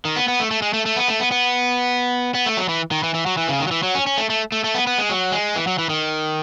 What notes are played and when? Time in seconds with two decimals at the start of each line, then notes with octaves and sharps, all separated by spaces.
0.05 D#3
0.16 B3
0.28 B3
0.40 A3
0.51 A3
0.62 G#3
0.73 A3
0.86 A3
0.96 B3
1.08 A3
1.20 B3
1.32 B3
2.34 B3
2.46 A3
2.57 F#3
2.69 E3
2.91 D#3
3.03 E3
3.14 E3
3.26 F#3
3.37 E3
3.49 C#3
3.60 D#3
3.67 F#3
3.71 E3
3.83 F#3
3.95 C#4
4.07 C#4
4.18 A3
4.30 A3
4.52 A3
4.64 A3
4.75 B3
4.87 B3
4.98 G#3
5.10 F#3
5.32 G#3
5.56 E3
5.67 F#3
5.79 E3
5.90 D#3